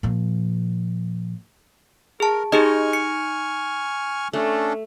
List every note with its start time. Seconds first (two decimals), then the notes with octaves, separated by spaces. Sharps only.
0.03 A#2 F3
2.20 G#4 A#4 A5
2.52 D#4 G4 G#4 D#5 G#5 C#6 F6
2.93 C#7
4.33 A3 C#4 D4 A4